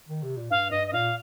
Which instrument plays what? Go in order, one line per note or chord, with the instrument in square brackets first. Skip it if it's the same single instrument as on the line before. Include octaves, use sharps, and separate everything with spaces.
[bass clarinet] D#3
C3
A#2
[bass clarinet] G2 [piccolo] F5
[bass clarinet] G2 [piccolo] D#5
[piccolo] D#5
[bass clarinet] A#2 [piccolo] F5